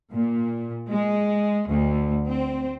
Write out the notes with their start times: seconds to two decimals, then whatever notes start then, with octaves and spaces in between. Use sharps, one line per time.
0.11 A#2
0.89 G#3
1.68 D2
2.27 C4